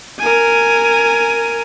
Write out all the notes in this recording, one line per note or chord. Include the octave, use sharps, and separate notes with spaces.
A#4 G#5